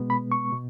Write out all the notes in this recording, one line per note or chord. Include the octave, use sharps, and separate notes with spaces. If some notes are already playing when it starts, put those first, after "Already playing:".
Already playing: B2 G#3 B3
B5
C#6
B2